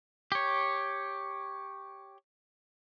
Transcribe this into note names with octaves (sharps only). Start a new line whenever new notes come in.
G4 C#5